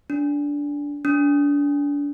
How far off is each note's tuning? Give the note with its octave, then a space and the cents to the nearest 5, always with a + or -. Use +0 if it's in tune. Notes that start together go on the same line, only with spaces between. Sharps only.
D4 -15
D4 -30